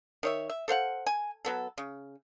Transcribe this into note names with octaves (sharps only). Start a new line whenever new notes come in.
D#3 C#5 E5
E5
A4 C5 F5 F#5
G#5
F#3 B3 A4
C#3